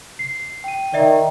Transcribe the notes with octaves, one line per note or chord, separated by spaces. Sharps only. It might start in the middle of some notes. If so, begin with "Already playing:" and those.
C7
G5 D#7
D#3 D5 E5 G5